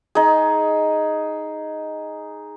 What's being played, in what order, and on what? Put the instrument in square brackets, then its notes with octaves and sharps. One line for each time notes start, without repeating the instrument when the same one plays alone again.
[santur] D#4 G#4